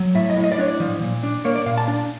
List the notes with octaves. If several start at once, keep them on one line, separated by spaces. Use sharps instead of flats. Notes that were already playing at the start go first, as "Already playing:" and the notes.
Already playing: F#3
A2 E5
D#5
A2
D#5
D5
D4 C#5
D5
F3
A#2
D4
A#3 C#5
D5
A#2 F5
A5
D4